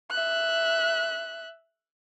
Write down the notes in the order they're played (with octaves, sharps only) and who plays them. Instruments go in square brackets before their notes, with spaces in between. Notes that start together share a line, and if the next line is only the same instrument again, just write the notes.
[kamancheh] E5 F#6